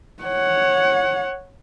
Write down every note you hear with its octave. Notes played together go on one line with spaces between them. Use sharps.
C#5 F#5